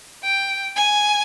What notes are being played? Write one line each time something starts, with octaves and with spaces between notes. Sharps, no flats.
G5
G#5